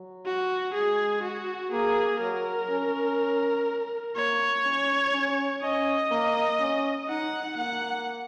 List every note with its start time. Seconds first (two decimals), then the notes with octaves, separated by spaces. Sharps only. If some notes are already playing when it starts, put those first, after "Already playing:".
Already playing: F#3
0.26 F#4
0.75 G#3 G#4
1.23 F#4
1.72 A#3 G#4
2.21 F#3 A#4
2.70 C#4
4.16 A#3 C#5
4.65 C#4
5.14 C#4
5.62 C#4 D#5
6.11 A#3
6.60 C#4
7.09 D#4 F#5
7.57 A#3 F#5